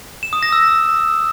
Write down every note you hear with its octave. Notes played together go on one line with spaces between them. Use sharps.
E7
D#6
A#6
E6